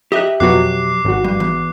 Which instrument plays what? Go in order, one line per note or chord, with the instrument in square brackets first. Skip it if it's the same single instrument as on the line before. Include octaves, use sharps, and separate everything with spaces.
[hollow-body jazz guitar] G4 E5 [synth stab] D#5 F#6
[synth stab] F2 B2 F#3 [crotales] D6 F#6 C7
[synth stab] G#1 F#4
[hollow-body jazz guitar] G2
E2